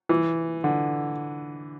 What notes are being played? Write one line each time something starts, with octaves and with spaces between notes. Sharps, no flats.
E3
D3